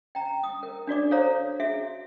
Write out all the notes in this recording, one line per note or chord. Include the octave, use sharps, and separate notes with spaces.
G5 A#5
D#6
A#4
D4 F#4 D5 D6
A4 C5 C#5 F5 A#5
F#4 G#4 E5